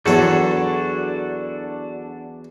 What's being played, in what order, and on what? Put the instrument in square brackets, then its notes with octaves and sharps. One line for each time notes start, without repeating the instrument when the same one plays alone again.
[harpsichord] E2 F#3 C#5 [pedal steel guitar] D4 F#4 A4